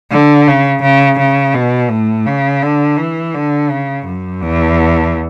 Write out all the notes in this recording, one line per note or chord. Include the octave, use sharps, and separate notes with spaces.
D3
C#3
C#3
C#3
B2
A2
C#3
D3
E3
D3
C#3
F#2
E2